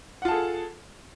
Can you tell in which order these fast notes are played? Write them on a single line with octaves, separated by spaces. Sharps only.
F#5 F4 A5 G#4 A4